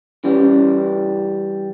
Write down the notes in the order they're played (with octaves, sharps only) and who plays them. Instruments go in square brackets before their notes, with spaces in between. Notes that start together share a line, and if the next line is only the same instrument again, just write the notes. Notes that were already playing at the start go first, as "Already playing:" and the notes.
[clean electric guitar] E3 G3 [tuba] C#4